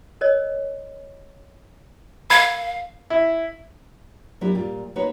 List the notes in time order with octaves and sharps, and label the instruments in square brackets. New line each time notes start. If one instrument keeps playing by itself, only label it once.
[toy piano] A#4 C#5 D#5
[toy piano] A#4 [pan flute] F5 [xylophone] B5 G#6
[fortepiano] E4
[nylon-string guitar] F#3 A#3 D4 E4 G4
A#2 G3 F4
A#3 D#4 F#4 B4 C#5